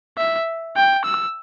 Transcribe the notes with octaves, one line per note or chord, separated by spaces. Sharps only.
E5
G5
E6